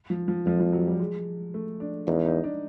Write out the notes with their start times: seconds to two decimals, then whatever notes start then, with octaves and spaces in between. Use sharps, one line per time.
0.10 F3
0.28 F3
0.46 F2 F3
0.60 F3
0.73 F#3
0.87 G3
0.99 G#3
1.54 A3
1.80 D4
2.07 E2 D#4
2.26 D#4
2.44 D4